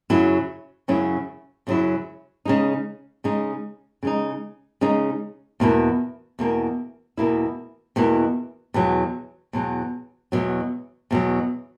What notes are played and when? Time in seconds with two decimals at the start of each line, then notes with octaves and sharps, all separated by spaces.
0.10 F#2 C#3 F#3 C#4 E4
0.88 F#2 C#3 F#3 C#4 E4
1.67 F#2 C#3 F#3 C#4 E4
2.45 C#3 G#3 D#4
3.24 C#3 G#3 D#4
4.03 C#3 G#3 D#4
4.81 C#3 G#3 D#4
5.60 E2 B2 A#3 E4
6.39 E2 B2 A#3 E4
7.17 E2 B2 A#3 E4
7.96 E2 B2 A#3 E4
8.74 E2 B2 F#3
9.53 E2 B2 F#3
10.32 E2 B2 F#3
11.11 E2 B2 F#3